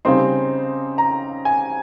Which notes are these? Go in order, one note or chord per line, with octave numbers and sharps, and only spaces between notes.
C#3 G3 C4 D#4 C6
A#5
G#5